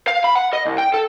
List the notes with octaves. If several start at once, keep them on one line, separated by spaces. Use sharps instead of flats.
F5
B5
F#5
D#5
C2
G5
A4